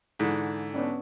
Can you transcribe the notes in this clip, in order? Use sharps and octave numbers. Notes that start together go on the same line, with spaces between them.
G#2 D3 E3
B3 C#4 D4